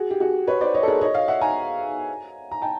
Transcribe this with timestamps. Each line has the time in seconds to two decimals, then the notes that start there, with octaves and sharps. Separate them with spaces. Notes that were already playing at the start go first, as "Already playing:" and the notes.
Already playing: F#4 G#4
0.10 G4
0.20 F#4 G#4
0.47 B4 C#5
0.61 C5 D5
0.74 C#5 D#5
0.83 A4
0.88 G#4 A#4
1.01 C#5 D#5
1.14 D#5 F5
1.28 E5 F#5
1.41 G#5 A#5
2.51 A#5
2.62 G5 A5